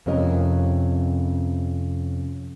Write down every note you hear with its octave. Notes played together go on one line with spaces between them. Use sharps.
F2 C3 C#4 F4 A#4 D#5